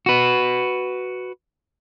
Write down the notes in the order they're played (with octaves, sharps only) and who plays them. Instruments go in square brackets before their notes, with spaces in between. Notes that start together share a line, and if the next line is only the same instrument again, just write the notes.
[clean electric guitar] F#4 B4